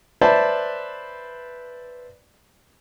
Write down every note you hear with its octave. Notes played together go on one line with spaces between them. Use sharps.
B4 C5 D5 E5 A5